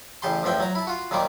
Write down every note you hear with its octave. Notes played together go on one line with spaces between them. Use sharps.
A1 C#3 G4 A5 C6
A1 E2 F3 E5 G5
F#3 A#5
E4 A5
F4 F#4
D#2 A#2 D#3 G3 A#3 D6